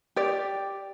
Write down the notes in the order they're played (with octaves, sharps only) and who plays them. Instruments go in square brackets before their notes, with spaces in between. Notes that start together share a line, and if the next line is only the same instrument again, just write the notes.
[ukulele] G4 D5